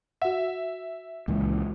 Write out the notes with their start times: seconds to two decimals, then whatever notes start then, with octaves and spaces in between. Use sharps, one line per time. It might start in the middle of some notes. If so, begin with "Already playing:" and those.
0.22 F#4 E5 F#5
1.28 C#2 A#2 E3 G#3